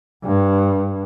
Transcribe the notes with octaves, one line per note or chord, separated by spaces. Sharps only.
G2